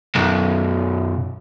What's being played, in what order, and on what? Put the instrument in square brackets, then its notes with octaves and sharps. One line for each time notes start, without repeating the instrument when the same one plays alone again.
[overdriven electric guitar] B1 F#2